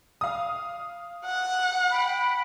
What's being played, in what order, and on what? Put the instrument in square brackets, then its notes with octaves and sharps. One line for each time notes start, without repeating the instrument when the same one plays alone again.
[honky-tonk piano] F5 D#6
[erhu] F#5
[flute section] G5 B5